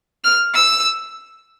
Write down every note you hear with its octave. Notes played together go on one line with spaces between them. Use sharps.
F6
E6